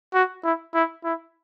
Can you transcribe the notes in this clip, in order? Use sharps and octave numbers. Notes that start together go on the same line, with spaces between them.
F#4
E4
E4
E4